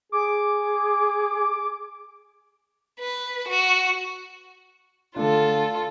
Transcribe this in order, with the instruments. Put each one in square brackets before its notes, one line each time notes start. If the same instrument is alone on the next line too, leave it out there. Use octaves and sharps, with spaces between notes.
[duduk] G#4 [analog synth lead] D6
[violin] B4
F#4
[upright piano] D3 A3 D4 [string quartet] F4 A4